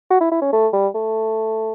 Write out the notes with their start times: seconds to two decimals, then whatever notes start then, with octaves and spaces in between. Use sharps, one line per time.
0.11 F#4
0.21 E4
0.32 E4
0.42 C#4
0.53 A3
0.73 G3
0.95 A3